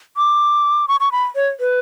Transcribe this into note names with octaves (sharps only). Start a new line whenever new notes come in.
D6
C#6
C#6
B5
C#5
B4